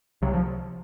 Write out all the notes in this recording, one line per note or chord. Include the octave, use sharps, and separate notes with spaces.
C2 C3 F#3
F3